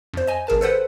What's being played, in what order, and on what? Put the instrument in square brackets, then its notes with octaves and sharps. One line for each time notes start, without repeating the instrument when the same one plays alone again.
[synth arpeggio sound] F2 C5
D#5 G#5
G#1 G#4 A#4 A5
A4 B4 C5 F#5